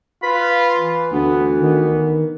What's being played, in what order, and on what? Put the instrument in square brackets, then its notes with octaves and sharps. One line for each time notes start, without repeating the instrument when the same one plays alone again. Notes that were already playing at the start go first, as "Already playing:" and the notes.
[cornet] F4 [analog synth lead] B4 [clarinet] B5
[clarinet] E3
[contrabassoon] D2 [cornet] B3
[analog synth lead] D#3 [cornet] B3